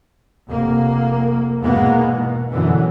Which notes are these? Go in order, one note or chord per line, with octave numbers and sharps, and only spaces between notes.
F1 A#3
E2 G#2 B2 G#3 A#3 B3
B2
F#2 B2 D3 E3